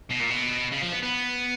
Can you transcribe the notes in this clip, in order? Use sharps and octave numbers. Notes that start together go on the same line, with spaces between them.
B2
A#2
B2
C#3
F3
B3
B3